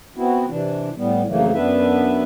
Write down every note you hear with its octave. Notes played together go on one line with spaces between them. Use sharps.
B3 C4 E4 F#4
C3 E3 D4
A2 G3 B3
F2 C#3 E3 F#3 A3 A#3
F#2 B3 D4 B4 E5